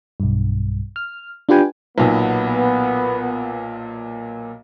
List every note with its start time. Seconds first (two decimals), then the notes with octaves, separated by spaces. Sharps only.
0.20 B1 G2
0.96 F6
1.49 D4 F4 G4 B4 G5 G#5
1.98 B1 A#2 B3